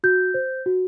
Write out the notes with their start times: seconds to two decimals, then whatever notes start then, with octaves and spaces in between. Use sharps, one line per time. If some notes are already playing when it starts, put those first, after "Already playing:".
0.04 F#4 G6
0.34 C5
0.66 F#4